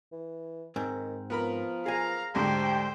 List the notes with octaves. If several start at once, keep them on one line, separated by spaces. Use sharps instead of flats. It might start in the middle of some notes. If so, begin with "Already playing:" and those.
E3
G#2 D#3 C4
F3 B3 A#4 B5
G#4 F5 G#5 A#5
D2 G#2 G4 C5 G5